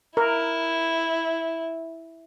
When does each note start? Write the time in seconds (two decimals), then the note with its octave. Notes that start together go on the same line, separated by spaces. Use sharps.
0.17 E4 A#4